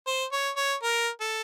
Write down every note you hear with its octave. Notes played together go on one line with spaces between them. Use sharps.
C5
C#5
C#5
A#4
A4